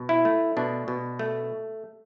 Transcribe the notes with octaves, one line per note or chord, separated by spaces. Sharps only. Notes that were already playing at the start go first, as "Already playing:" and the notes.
Already playing: B2
E4
A3
B2 D4
B2
A3